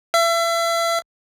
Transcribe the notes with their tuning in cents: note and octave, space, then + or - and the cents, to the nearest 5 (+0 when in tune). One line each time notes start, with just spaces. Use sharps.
E5 +35